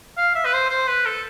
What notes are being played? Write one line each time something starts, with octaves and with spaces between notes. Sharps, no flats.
F5
E5
B4
C5
C5
B4
A4